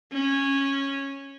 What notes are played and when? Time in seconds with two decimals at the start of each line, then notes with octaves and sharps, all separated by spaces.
0.13 C#4